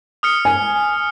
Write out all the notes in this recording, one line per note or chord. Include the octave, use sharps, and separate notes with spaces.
D#6 F6 C#7
G#5